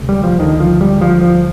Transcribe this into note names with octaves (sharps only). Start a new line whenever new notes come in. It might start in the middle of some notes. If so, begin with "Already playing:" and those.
Already playing: D2 C3
G3
F3
D2 D3 D#3
F3
G3
F3
F3